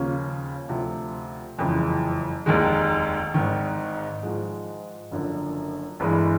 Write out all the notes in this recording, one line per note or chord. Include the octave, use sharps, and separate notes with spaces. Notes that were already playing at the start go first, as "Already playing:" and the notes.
Already playing: D#2 C#3 F3 A#3 C#4
D2 C3 F3
F#1 F2 C#3 E3 G#3
F1 D#2 D#3 G#3
G#1 G#2 D#3
G#2 F3 G#3
F#1 F#2 D3 F3
G1 G2 E3 G#3